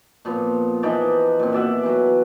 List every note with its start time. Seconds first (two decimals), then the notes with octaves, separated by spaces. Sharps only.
0.25 A#2 F3 B3
0.83 E3 F3 D#4 D5
1.39 A#2 C4
1.53 B2 D5 E5 F#5
1.83 E3 F#3